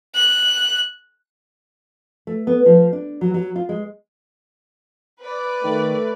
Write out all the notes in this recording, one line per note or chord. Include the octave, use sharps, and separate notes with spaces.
F#6
A3
B3
F3
D4
F#3
F#3
F4
G#3
B4 D5
D#3 A3